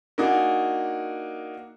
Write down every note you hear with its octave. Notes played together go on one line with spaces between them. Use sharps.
A#3 D4 D#4 F#4 G#4